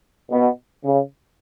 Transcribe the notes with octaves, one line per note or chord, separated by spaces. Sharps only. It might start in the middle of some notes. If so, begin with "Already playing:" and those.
B2
C#3